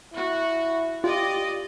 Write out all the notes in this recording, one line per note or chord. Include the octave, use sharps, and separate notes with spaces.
E4 F#4
F4 G4 D5 D#5